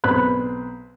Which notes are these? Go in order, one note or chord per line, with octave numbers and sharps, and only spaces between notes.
B1 C4 B4 B5 F#6